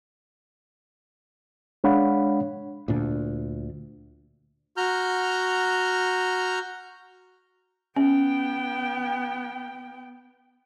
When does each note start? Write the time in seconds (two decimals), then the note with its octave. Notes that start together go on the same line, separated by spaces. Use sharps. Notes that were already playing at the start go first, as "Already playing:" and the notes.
1.84 G#3 D4 C#5 F5 F#5 B5
2.88 D2 A#2 D4
4.77 F#4 A#5 F6 G6
7.96 B3 C#4 G5